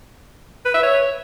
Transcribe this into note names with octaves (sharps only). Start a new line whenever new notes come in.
B4
E5
C#5